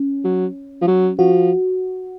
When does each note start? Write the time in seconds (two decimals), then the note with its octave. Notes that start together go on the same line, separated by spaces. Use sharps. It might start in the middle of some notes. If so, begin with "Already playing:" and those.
Already playing: C#4
0.24 F#3
0.81 F3
0.88 F#3
1.18 F3 F#4